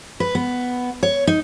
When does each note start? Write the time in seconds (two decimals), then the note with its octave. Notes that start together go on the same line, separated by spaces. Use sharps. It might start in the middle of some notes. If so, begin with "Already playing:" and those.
0.20 B4
0.35 B3
1.03 C#5
1.27 D#4